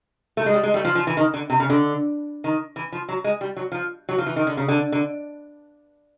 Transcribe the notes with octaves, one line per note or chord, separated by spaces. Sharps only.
A3
G#3
G3
G#3
G3 A3
F3
F3
E3
D#3
D3
C3
C#3
D3
D#3
E3
F3
F#3
G#3
G3
F#3
F3
F#3
F3
E3
D#3
D3
C#3
D3
D3